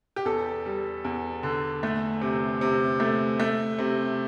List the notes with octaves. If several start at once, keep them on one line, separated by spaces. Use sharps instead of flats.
G4
E2 A4
G3
E2
D3
A3
C3
C3
A3
A3
C3